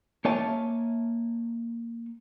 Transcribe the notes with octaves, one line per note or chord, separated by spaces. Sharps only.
A#3 A#4 C#5 E5 G#5 A5